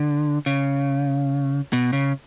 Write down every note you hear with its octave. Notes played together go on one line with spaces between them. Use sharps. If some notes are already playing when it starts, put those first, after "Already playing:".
Already playing: D3
C#3
B2
C#3